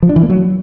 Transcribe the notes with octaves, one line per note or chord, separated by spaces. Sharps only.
F3
D4
E3
A#3
F#3